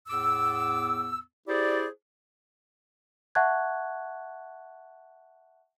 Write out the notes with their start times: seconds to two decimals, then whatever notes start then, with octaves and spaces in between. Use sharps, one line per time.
0.08 E2 A2 B3 D6 E6
1.48 E4 G4 G#4 C5 D5
3.35 E5 F#5 A5 C#6 F#6 G#6